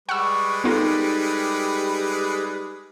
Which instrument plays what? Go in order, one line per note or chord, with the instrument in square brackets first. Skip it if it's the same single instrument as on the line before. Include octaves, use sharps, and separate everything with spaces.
[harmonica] G3 G#3 B4 [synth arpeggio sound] F#5 E6 [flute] C#6
[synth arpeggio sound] B3 F4 A#4 [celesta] D#4 A4 [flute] G4